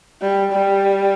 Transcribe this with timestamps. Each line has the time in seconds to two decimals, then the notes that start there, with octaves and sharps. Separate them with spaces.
0.21 G3
0.52 G3